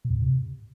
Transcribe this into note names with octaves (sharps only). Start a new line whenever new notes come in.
B2
E2
G#2
C3